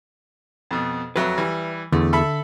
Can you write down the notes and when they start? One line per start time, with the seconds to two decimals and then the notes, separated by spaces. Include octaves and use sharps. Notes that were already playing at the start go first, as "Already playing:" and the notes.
0.71 F2 B2
1.16 F2 F#3 B4 E5
1.37 E3 G3
1.93 E2 D3 A3
2.13 A4 E5 B5